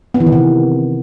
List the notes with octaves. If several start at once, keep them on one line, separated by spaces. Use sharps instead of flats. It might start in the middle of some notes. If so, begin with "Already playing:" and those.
B3
E3
D#3
C3